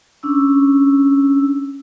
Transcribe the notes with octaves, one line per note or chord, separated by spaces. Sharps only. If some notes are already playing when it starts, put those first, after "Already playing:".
C#4 D4 E6